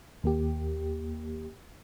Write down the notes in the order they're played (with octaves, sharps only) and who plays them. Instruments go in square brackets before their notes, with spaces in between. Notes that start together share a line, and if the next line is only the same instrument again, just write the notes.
[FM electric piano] D#2 A#3 G4